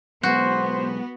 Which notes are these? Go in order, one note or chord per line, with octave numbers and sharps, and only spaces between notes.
B1 G#3 B3 F#4 C5